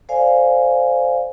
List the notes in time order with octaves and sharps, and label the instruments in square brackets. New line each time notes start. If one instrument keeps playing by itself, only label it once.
[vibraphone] A4 C5 D5 F5 G#5